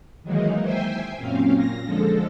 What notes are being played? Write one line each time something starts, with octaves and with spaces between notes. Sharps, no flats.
D#3 E3 F#3 G#3 A#3 D#4
C5 E5 G5 G#5 C6
F#2 A#2 C4 C#4 F5
A#2 A#6
D3 F3 G#3 A4